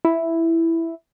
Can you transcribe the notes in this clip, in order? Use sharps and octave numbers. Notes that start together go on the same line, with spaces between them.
E4